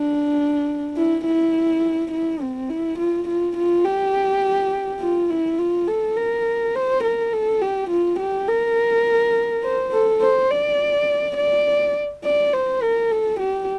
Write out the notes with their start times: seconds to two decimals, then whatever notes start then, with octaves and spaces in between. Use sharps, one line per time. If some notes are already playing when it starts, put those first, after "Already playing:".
Already playing: D4
0.97 E4
1.25 E4
2.11 E4
2.41 C4
2.70 E4
2.98 F4
3.28 F4
3.57 F4
3.85 G4
5.00 F4
5.30 E4
5.58 F4
5.87 A4
6.17 A#4
6.75 C5
7.03 A#4
7.33 A4
7.61 G4
7.90 F4
8.19 G4
8.48 A#4
9.63 C5
9.93 A4
10.21 C5
10.51 D5
11.37 D5
12.24 D5
12.53 C5
12.82 A#4
13.11 A4
13.40 G4